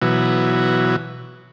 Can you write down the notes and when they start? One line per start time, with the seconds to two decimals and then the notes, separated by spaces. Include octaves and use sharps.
0.02 B2 E3 F#3